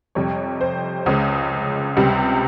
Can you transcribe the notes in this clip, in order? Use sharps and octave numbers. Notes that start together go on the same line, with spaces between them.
F2 C3 G3 C#5
C5
C#2 C#3 G#3
C#2 C3 G3